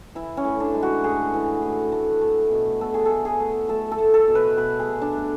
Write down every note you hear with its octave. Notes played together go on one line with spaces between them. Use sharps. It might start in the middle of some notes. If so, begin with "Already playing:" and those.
E3 E4
C#4
A2
D4
G#3
F#4
A2 G#4
E3
A2
A3
A3
B2
B2 A4
G#4
A3 A4
G#4
A3
A3 A4
A4
A3
A4
B2
B4
B2 B4
G#4
A3
D4
A3